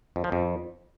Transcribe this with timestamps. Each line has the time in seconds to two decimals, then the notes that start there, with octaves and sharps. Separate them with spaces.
0.16 F2
0.24 F3
0.32 F2